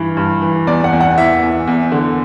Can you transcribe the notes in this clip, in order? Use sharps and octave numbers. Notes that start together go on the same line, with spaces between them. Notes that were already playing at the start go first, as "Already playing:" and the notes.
Already playing: G2 E3
G2
E3
E2 D5
F#5
E2
F#5
E3 E5
E2
E2
D3